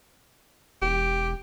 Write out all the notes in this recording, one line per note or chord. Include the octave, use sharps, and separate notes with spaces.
E1 G4